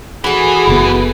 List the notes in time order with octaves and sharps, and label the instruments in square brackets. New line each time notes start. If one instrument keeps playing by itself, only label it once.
[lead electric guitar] E3 [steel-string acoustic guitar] F#4 A4 [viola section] G#4
[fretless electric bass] F#1 C#3 B3